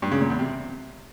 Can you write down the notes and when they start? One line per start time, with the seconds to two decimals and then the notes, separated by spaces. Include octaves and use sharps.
0.02 G2
0.12 C#3
0.21 A#2
0.30 E2
0.39 C3